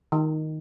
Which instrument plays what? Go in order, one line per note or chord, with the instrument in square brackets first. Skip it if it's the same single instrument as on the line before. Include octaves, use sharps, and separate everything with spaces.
[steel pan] D#3